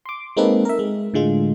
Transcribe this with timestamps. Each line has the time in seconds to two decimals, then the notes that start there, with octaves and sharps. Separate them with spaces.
0.06 C6 D6
0.37 G#3 A#3 C4 D#4 A4 B4
0.65 A#4 E5
0.79 G#3
1.14 A2 D3 G#3 F4